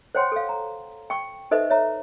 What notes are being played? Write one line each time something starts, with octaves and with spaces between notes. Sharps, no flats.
C5 C#5 F#5 G5 C6
A4 F5
A#5
G5 C#6
D#4 A4 B4 C5 D#5 E5
C#5 E5 A#5